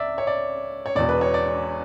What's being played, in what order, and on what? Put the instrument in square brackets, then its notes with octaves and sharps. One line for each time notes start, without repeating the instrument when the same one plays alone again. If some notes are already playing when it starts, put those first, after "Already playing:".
Already playing: [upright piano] C#2 D5 E5
C#5
D5
C#5
E1 E2 B2 D5
B4
C#5
D5